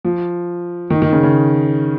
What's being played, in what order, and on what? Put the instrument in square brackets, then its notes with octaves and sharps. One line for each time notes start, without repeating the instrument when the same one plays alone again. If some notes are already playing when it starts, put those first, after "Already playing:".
[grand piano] F3
D#3
D#3
C#3
C#3